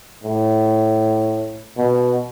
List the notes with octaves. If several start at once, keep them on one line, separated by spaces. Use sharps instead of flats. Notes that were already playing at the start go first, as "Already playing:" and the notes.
A2
B2